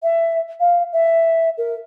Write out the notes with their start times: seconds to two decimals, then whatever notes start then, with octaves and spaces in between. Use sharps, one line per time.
0.02 E5
0.60 F5
0.92 E5
1.57 A#4